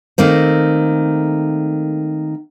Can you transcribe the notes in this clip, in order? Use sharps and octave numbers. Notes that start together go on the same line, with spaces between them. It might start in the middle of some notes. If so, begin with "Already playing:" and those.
D#3 A3 A#3 C4